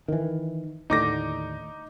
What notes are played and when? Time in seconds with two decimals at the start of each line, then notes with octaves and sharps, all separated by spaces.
0.08 D#3 E3
0.90 D#2 A2 D3 D#4 D6 A#6